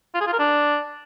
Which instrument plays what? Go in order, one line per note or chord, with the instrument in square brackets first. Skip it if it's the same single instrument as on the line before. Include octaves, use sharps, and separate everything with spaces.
[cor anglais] F4
G#4
F4
A#4
D4